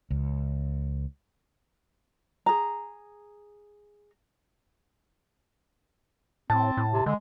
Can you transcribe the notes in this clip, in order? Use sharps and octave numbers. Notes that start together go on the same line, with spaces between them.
C#2
G#4 A#5
A2 C4 A5
A2
C3
D3 G#3